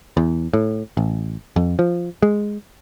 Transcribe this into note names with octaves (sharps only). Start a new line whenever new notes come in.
E2
A2
A1
F2
F3
G#3